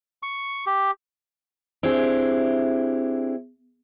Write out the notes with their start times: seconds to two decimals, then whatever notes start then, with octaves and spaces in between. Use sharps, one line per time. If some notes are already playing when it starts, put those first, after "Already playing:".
0.23 C#6
0.66 G4
1.83 C4 D4 E4 G4 G#4